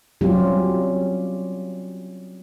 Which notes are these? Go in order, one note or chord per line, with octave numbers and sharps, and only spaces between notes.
F#3 G3 C4 C#4 F4 G4